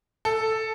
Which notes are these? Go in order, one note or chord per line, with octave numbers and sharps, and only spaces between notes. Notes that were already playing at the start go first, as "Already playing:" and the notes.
A4